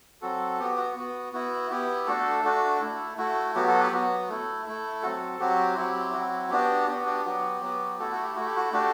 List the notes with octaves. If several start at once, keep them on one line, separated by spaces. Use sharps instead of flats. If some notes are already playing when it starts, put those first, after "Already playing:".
F#3 C4 F#4 A4
B3 F#4 G4
F#4
B3 F#4
B3 E4 F#4
B3 E4 G4
A3 D4 F#4 A4
A3 D4 F#4
A3 E4
A3 E4 F#4
F#3 B3 F#4 G4
F#4 A4
G4 B4
F#3 B3 F#4
A3 E4
A3 E4
F#3 C4 F#4 A4
F#3 C4 F#4 G4
F#3 C4 E4 G4
F#3 C4 E4 F#4
B3 D4 F#4 G4
B3 D4 F#4 G4
G4
F#3 B3 F#4
F#3 B3 F#4
A3 E4 F#4 A4
F#4
G4
A3 E4 F#4
G4
F#4
A3 D4 F#4 G4